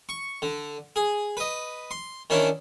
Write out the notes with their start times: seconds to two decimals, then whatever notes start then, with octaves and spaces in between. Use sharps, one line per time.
0.09 C#6
0.42 D3
0.96 G#4
1.37 B4 D#5
1.91 C6
2.30 D#3 C#4 D4 E4